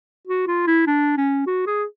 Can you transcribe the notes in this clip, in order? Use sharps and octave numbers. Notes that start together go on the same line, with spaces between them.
F#4
F4
E4
D4
C#4
F#4
G#4